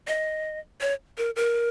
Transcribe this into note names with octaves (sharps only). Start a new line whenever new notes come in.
D#5
C#5
A#4
A#4